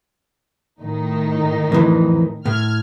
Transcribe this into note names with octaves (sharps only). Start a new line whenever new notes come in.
A2 D#3 D#4
F2 E3
A2 F6 G#6